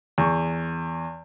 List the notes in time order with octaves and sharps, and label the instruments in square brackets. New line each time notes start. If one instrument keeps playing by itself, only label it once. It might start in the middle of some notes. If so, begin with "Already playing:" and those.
[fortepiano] E2 C#6